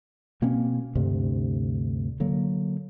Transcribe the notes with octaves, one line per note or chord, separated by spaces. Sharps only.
B2 A#3 C4 C#4
D2 G2 C3
D3 F#3 A#3